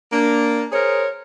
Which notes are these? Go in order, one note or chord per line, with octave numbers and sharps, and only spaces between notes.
A#3 D4
G#4 A#4 C5 C#5